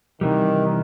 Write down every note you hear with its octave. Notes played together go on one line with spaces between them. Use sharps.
C3 D#3 E3 G3